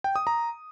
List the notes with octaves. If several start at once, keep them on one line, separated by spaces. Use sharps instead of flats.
G5
D#6
A#5